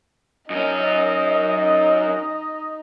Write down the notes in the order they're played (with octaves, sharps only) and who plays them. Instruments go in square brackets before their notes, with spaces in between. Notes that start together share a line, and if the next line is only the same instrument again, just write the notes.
[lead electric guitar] F#2 C#4 [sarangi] D#4 [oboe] D#5